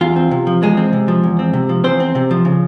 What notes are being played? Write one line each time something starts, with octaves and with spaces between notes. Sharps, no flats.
E2 F4
C4
C3
F3
E2 G#3 G#4
C4
C3
F3
E2
C4
C3
F3
E2 C4 C5
C4
C3
F3
C#3